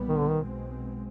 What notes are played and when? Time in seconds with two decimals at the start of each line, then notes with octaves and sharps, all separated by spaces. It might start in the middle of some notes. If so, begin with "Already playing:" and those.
Already playing: B1 A#2 G3 B3
0.08 D#3
0.18 D3
0.28 D#3
0.40 B1 B2 G#3 C4